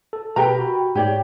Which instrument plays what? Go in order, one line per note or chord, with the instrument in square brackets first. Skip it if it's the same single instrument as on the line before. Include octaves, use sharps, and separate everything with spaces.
[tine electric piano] A4
[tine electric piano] B2 B4 [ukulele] G4 A#4 A#5
[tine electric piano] F#4 B5
[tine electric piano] G#2 [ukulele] G4 C#5 D5